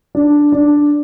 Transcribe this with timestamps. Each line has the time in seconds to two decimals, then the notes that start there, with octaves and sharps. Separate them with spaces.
0.15 D4
0.52 D4